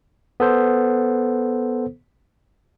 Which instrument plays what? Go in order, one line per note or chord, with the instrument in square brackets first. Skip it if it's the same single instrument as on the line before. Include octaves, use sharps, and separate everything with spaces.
[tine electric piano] B3 A4 C5